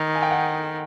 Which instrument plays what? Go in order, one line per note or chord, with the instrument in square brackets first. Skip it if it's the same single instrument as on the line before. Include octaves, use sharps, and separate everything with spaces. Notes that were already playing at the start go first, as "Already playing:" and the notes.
Already playing: [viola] D#3
[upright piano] G#5
G5
F#5